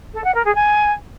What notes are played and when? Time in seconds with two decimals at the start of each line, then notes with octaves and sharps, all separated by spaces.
0.14 A4
0.24 F#5
0.34 A#4
0.44 G#4
0.55 G#5